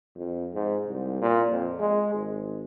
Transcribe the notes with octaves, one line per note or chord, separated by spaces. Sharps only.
F2
G#2
C2
A#2
F2
G#3
G#1